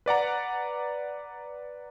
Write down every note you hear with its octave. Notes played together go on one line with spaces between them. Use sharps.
B4 D5 F#5 A#5